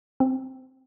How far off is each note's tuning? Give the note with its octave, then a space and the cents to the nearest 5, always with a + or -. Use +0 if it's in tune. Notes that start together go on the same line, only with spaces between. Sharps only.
C4 +0